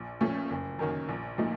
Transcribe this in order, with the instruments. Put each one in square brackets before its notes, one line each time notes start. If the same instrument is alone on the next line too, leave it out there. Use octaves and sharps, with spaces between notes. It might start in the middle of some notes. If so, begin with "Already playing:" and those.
Already playing: [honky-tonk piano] A#1
A#2 F3 A3 C#4
F#1
F#2 D#3 A#3 C#4
A#1
A#2 F3 A3 D#4